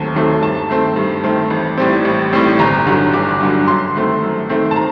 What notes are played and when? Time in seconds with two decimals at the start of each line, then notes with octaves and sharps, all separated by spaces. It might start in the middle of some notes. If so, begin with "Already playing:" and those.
Already playing: D#2 D#3 F#3 A3 C4 A5
0.15 D#3 F#3 A3 C4
0.42 G2 A5
0.70 D#3 A3 C4
0.96 G2
1.24 D#3 A3 C4
1.50 A1
1.78 A2 G3 C4
2.05 A1
2.33 A2 G3 C4
2.59 G1 A#5
2.87 G2 D3 F#3
3.13 G1 D6
3.41 G2 D3 F#3
3.67 F#2 C6
3.96 D#3 A3 C4
4.22 F#2
4.49 D#3 A3 C4
4.71 A5
4.76 A#5